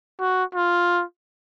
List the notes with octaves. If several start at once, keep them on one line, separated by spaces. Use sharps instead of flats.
F#4
F4